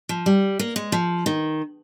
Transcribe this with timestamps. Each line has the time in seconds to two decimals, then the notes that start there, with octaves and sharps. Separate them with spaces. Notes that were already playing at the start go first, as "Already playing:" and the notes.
0.09 F3
0.26 G3
0.59 A#3
0.76 G#3
0.92 F3
1.26 D#3